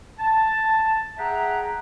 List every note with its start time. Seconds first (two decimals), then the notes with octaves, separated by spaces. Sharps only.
0.18 A5
1.19 G#4 E5 F#5 G5 A#5